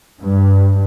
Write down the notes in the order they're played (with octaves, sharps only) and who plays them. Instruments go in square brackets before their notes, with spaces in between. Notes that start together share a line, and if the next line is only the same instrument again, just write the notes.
[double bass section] G2